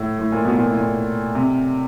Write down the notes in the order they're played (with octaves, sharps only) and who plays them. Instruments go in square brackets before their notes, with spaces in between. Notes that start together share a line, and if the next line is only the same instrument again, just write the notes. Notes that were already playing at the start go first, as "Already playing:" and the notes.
Already playing: [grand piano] A2
A2
A#2
B2
A#2
A2
A#2
C3